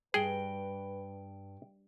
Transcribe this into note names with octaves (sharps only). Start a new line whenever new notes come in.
G2 G#4 B4 G5 D7 G7